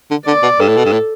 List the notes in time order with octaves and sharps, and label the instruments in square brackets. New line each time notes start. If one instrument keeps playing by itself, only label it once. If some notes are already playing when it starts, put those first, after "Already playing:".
[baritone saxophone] D3
[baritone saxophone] D3 [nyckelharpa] D5
[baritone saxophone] B2
[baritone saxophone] G2 [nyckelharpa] A4
[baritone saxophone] A2
B2
G2
A2